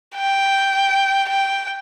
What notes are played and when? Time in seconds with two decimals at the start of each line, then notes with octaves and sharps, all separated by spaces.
0.15 G5
1.29 G5